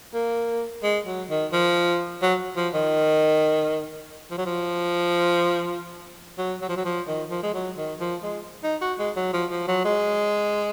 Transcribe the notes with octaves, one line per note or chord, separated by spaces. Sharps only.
A#3
G#3
F#3
D#3
F3
F#3
F3
D#3
F3
F#3
F3
F#3
F#3
F3
F#3
F3
D#3
F3
G#3
F#3
D#3
F3
G#3
D#4
F#4
G#3
F#3
F3
F3
F#3
G#3